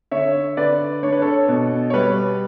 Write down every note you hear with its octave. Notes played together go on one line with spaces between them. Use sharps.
D3 C#5 E5
D3 B4 D5
D4 C#5
B4
A4 C#5
B2
C#5
G3 B4